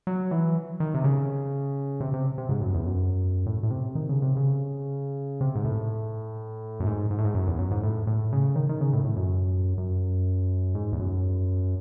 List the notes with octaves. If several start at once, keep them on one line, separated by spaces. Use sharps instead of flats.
F#3
E3
D#3
C3
C#3
C3
C3
C3
G#2
F#2
E2
F#2
A2
A2
C3
D#3
C#3
C3
C#3
C3
G#2
A2
F#2
G#2
G#2
A2
G#2
F#2
E2
F#2
G#2
A2
A2
C#3
D#3
D#3
C#3
A2
A2
F#2
F#2
G#2
E2
F#2